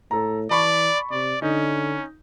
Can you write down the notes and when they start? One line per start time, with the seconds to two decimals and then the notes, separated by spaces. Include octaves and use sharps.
0.11 A2 A4 A#5
0.50 E3 D5 A5 B5 C#6
1.11 C3 D5
1.42 D3 C#4 D#4